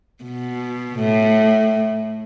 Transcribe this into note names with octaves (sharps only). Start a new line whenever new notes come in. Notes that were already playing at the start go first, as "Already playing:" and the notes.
B2
A2